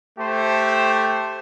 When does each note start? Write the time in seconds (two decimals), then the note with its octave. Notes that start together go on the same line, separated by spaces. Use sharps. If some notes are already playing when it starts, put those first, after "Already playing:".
0.19 A3 G4 C5